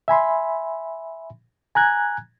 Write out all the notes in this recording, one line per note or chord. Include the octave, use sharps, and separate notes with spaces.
E5 G#5 B5 C6
G#5 A#5 F#6 G#6